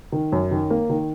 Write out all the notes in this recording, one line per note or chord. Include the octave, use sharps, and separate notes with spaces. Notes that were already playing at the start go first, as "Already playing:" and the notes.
D#3
F#2
D#3
A#3
D#3